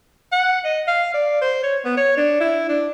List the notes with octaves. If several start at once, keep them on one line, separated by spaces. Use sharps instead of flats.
F#5
D#5
F5
D5
C5
C#5
B3
C#5
D4
E4
D4